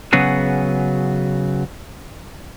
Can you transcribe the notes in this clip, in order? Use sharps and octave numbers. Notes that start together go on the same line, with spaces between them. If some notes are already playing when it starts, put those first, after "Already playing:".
C#3 F#3 B3 F#4 G#4